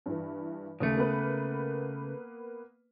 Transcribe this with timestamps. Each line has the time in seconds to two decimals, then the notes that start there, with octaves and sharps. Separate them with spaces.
0.06 G2 E3
0.80 D#2 C#3 A3
0.97 A#3 B3 B4